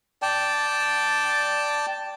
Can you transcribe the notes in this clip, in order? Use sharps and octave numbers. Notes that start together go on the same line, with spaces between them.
D5 G5 A5